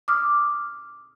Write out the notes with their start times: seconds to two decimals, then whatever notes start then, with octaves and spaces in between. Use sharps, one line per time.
0.08 D6 D#6 F6